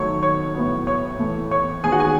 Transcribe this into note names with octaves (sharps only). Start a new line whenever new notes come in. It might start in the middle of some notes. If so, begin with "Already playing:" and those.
Already playing: D#3 F#3 A3 C#5 C#6
C#5 C#6
A2 F#3 B3
C#5 C#6
A2 E3 A3
C#5 C#6
D#3 G#3 B3 G#4 G#5
F#4 F#5
G#4 G#5